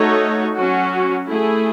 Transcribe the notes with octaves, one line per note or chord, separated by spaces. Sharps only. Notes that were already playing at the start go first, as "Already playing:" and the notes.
Already playing: A3 D#4 F#4 A4 C#5
F#3 C#4 F#4
A3 E4 G#4